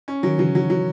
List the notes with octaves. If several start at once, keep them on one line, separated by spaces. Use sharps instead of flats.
C#4
D#3 F#3
C#3 E3 F#3
F#3
F#3